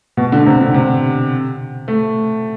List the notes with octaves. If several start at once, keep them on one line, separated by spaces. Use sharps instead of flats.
B2
D3
C3
D3
C3
A3